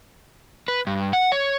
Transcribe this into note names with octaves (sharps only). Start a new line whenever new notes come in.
B4
G2
F#5
C#5